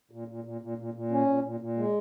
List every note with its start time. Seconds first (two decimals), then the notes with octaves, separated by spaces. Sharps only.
0.11 A#2
0.28 A#2
0.44 A#2
0.61 A#2
0.78 A#2
0.94 A#2
1.11 C#4
1.27 A#2
1.44 A#2
1.60 A#2
1.77 G#3